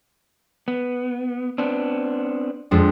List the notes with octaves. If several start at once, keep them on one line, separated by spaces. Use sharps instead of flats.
B3
B3 C4 D4
F2 G#3 D4